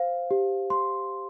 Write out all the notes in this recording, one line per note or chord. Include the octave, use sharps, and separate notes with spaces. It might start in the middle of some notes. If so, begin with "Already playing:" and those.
Already playing: C5 F5
G4
C6